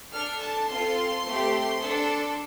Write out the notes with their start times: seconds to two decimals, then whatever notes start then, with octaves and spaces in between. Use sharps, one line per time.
0.13 D4 A4 F6
0.41 A5
0.70 C4 F4 A4 C6
1.26 A3 C4 G4
1.83 D4 A4